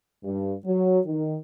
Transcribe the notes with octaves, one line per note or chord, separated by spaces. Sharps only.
G2
F#3
D#3